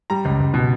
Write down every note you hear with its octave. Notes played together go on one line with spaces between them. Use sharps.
G3 A#5
C#2
C#2
B2